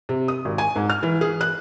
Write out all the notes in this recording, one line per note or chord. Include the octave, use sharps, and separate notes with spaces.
C3
D#6
G#1
G#5
G#2
F6
E3
G#4
F#6